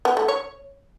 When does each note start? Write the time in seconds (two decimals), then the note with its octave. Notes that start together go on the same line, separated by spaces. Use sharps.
0.05 B3
0.17 A3
0.28 C#5